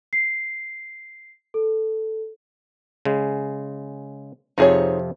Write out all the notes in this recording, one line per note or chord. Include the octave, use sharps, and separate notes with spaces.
C7
A4
C#3 G#3
F2 C3 F3 D#4 G#4 C#5